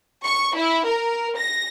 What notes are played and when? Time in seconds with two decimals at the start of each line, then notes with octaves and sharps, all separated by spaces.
0.25 C#6
0.55 E4
0.86 A#4
1.38 A#6